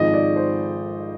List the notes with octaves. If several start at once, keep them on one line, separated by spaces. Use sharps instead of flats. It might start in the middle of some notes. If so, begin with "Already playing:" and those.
Already playing: G#1 G#2 F3 D#5
D5
C5